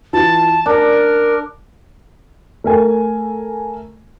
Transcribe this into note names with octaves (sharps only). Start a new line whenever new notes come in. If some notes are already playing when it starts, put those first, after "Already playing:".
E3 F4 A5
D4 A#4 A5
A3 A#4 G#5